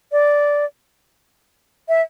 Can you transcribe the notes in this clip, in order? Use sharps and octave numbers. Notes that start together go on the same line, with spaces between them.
D5
E5